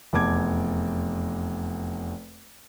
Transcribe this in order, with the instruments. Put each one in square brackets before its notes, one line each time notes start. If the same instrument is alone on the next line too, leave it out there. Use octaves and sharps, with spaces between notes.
[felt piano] F1 E2 A5 D6 G#6